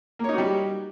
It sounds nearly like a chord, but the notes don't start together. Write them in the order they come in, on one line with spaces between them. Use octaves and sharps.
A#3 C#5 D#4 F#4 G3